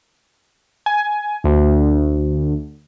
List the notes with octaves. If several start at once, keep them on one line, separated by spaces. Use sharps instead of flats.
G#5
D2